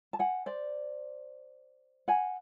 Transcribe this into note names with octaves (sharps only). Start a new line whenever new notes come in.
A5
F#5 G#5
C5 D5
F#5 G#5